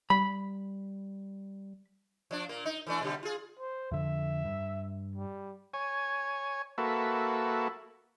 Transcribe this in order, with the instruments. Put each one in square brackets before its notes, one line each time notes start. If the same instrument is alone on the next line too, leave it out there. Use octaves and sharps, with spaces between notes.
[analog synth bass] G3 [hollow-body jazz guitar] B5
[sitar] F3 D4
A#2 A#3
D#4
E3 A3 D4
B2 D3 G3
F4 G#4
[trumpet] C5
[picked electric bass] F2 D3 [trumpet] E5
[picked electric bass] G2
[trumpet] G3
[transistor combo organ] C#5 G#5
A#3 F#4 A4 B4 E5